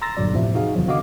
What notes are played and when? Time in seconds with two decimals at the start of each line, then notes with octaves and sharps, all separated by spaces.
0.02 A#5 C6 E6 A6 A#6
0.17 G1 G2 A#2 D3 F#3 D5
0.33 E2 A2 C3 F3 E5
0.55 D#4 F#4 G#4 F5
0.75 E2 C3 D#3 F3 F#3
0.87 D3 B3 F#4 D#5 F5 D6